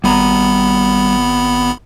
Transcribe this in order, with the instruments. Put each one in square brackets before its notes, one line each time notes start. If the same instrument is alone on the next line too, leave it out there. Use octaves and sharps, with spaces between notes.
[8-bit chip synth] G#1 B3 B5 [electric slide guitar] G3 D#5 A#5